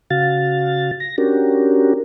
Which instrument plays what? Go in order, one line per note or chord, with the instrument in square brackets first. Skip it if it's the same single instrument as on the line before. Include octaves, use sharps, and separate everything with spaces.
[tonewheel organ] C#3 F#4 F5 A6
A#6
C#4 D4 F#4 G4 A#4